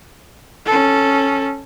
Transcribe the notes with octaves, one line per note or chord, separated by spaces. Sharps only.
C#4 A4